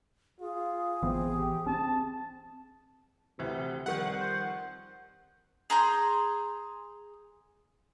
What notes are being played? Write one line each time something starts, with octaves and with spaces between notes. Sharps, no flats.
F4 G#4
A1 E3 B3 C4
G4
C4 C#4 A5
D2 C3 E3
F2 D#3 G3 F#5 G6
C5
G#4 A#5 C6 G6